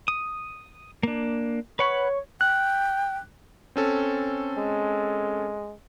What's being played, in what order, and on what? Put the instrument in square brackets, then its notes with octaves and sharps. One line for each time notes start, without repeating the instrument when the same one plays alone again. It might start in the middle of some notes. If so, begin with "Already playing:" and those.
[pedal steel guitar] D#6
A#3 D4
[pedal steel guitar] B4 F#5 B5 [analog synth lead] C#5
[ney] G5 [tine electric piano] F#6
[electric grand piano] C4 C#4 A4
[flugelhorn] G#3